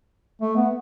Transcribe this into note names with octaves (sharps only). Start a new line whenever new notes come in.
A3
B3